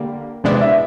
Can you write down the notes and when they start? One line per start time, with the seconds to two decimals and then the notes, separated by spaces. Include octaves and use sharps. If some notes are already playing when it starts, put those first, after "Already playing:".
Already playing: D3 G3 A#3
0.44 C3 E3 G#3 B3 D4 D5
0.61 E5